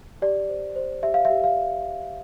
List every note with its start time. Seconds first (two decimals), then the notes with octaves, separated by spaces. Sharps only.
0.22 G4 D5
0.49 C5
0.76 C5
1.03 G4 E5
1.14 F5
1.25 E5
1.30 G4
1.44 F5